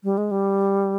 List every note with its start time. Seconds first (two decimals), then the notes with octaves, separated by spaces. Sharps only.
0.04 G3
0.18 G#3
0.31 G3